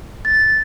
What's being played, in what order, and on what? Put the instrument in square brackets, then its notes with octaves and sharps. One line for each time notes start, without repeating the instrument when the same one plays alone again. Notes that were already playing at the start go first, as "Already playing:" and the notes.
[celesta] A6